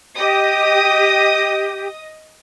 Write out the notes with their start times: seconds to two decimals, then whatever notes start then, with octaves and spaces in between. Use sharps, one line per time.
0.16 G4 D#5 D#6